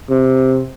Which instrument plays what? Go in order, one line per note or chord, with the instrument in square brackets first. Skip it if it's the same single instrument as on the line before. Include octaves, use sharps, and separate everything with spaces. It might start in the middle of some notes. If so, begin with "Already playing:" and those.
[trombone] C3